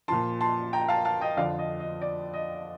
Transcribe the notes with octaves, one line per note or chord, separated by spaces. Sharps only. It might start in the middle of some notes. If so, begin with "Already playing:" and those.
A#2 F3 A5 C6
A5 C6
G5 A#5
F5 A5
F5 A5
D#5 G5
F2 D3 F3 D5 F5
D#5
D#5
D5
D#5